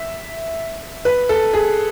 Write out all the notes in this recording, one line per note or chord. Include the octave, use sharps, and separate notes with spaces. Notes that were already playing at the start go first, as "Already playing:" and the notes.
Already playing: E5
B4
A4
G#4